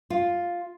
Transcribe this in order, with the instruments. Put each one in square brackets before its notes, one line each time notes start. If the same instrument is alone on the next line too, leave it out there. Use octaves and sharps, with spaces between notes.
[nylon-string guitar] F4